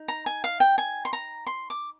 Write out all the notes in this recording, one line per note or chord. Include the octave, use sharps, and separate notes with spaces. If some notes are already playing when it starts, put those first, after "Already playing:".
Already playing: D#4
A#5
G#5
F5
G5
G#5
C6
A#5
C6
D6